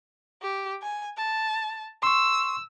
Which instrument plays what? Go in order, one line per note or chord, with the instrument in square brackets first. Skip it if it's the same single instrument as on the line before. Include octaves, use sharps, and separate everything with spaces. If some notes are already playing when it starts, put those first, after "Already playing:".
[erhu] G4
G#5
A5
[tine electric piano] C6 C#6 [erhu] E6